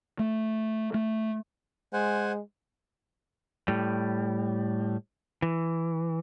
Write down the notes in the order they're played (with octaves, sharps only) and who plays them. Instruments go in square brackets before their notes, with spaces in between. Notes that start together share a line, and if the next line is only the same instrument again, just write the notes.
[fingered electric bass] A3
A3
[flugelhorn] G#3 [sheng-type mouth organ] C5 F#5 G#5
[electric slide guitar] A2 G3
E3